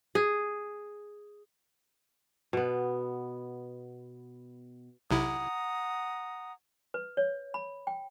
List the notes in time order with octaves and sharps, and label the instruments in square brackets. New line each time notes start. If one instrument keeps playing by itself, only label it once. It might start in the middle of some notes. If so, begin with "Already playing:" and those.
[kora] G#4
B2 B3
[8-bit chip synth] B1 C3 E4 [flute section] F#5 A#5 D#6
[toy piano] B4
C#5
B5
G5